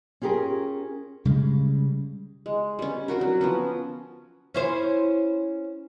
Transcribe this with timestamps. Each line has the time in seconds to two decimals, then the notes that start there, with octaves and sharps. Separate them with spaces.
0.22 C#4 F4 G4 G#4 A#4
1.25 C#3 G3 G#3
2.46 G#3
2.79 G3 C#4
3.08 C4 F4 F#4 A#4
3.21 F#3
3.41 F3 B3 C#4
4.54 C#4 E4 C5